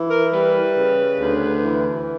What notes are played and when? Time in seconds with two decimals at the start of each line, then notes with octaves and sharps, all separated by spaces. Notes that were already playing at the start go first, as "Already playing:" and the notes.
Already playing: E3
0.10 A#4
0.33 G3 B4
0.76 C#3
1.20 D2
1.65 E3